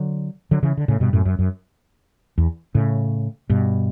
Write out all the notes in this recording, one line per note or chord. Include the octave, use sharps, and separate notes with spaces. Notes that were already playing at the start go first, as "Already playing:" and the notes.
Already playing: D3 F#3
D3 F#3
C#3 E3
D3
A2 C#3
G2 B2
F#2 A2
F#2
F#2
E2
A2 C#3
G2 B2